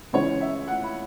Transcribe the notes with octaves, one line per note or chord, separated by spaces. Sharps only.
C#2 C#3 E3 C#5
E5
F#5
B5